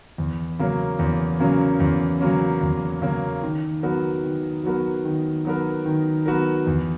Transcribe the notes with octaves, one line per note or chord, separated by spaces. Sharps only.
E2
C#3 F#3 A#3 C#4
E2
C#3 F#3 A#3 C#4
E2
C#3 F#3 A#3 C#4
E2
C#3 F#3 A#3 C#4
D#3
F#3 B3 F#4 A#4
D#3
F#3 B3 F#4 A#4
D#3
F#3 B3 F#4 A#4
D#3
F#3 B3 F#4 A#4
E2